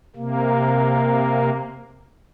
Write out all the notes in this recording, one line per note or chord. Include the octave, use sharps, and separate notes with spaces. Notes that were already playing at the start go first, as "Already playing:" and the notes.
C3 A#3